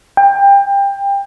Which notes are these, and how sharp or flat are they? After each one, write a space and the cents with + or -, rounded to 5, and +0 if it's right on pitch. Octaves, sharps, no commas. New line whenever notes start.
G5 +25